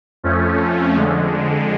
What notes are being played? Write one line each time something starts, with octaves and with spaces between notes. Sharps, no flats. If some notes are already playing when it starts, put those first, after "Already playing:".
F2 F3 A3 C#4
F2 D3 G#3